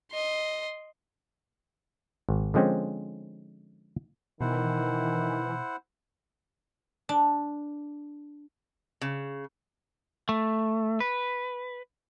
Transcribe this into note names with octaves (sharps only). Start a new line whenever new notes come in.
D#5 C6
G#1
D3 F3 G#3 C4 C#4
B2 D#3 E3 E4 C5 F#5
D4
C#3
A3
B4